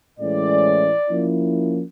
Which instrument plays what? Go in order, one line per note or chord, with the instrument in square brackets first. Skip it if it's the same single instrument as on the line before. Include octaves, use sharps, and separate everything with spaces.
[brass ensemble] A2 E3 G#3 C#4 D5
F3 A#3 C#4 E4